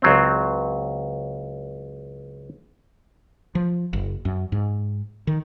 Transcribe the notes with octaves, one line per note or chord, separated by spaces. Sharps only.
C#2 F#3 C4
F3
F#1
F#2
G#2
D#3